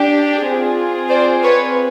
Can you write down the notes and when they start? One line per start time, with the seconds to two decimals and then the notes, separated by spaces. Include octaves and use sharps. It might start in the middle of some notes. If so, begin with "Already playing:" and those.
Already playing: D4 G4
0.45 C4 F4 G#4
1.10 C5 D5
1.43 B4 C#5